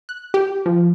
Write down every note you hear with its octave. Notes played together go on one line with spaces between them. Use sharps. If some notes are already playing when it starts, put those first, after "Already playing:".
F#6
G4
F3